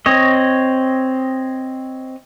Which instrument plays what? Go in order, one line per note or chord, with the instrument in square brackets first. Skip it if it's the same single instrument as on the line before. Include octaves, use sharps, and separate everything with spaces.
[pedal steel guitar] C4 C#5 D#5